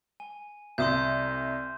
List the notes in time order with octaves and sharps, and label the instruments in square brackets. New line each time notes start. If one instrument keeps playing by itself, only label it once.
[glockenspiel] G#5
[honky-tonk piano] C2 [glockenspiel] C6 D#6 G6